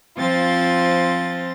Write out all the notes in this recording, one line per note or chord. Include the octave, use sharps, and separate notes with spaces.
F3 C4 F4 A6